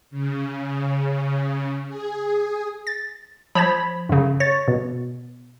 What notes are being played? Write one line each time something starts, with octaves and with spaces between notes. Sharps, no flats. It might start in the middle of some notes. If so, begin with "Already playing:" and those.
C#3
G#4
A6
F3 C5 B5 G#6
F#2 C#3
C#5 A6
B2